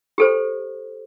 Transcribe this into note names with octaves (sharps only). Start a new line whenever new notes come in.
G4 A4 C5